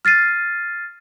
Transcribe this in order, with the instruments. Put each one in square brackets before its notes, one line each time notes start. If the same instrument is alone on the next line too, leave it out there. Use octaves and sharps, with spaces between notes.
[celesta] F6 A6 C7 D#7